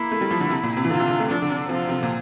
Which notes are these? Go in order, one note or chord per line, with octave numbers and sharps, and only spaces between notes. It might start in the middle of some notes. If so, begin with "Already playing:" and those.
Already playing: A#3 E4
A3
G3
F3
D3
C3
A#2
C3
E3
D3 F4
C3
D3
A3
F3 D4
D3
C3
C3 F3
C3
A#2